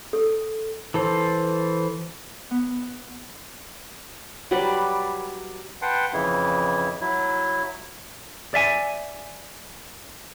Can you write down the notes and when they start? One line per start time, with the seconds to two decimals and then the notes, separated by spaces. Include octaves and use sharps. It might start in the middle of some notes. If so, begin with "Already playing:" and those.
0.13 A4
0.94 E3 A4 C5
2.51 B3
4.51 F#3 G3 B4 D5
5.82 B4 F#5 G5 A5 C6
6.13 F2 C#3 E3 E4
7.01 F#3 E4
8.54 D5 E5 G#5